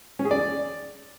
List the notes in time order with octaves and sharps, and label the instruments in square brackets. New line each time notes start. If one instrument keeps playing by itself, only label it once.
[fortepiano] C#4
G#4
D5